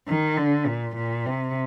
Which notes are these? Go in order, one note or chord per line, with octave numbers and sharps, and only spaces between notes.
D#3
D3
A#2
A#2
C3